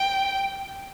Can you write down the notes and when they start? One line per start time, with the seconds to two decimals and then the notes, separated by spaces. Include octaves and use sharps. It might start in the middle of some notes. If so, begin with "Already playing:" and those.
Already playing: G5